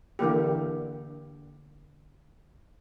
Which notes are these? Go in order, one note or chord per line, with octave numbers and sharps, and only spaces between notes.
D3 E3 A#3 G4